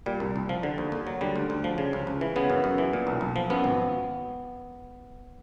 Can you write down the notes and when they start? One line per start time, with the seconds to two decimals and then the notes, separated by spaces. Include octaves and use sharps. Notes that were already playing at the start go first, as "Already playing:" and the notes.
0.06 A#2 G3
0.20 C2
0.36 C2
0.49 F3
0.63 D3
0.78 D#2
0.92 D#2
1.07 F#3
1.21 D3 G3
1.36 D2
1.50 D2
1.64 F3
1.78 C#3
1.93 C#2
2.07 C#2
2.21 E3
2.36 C#3 B3
2.50 F#2
2.64 F#2
2.78 E3
2.93 A#2
3.07 B1
3.21 B1
3.36 F3
3.50 F#2 B3
3.64 G#1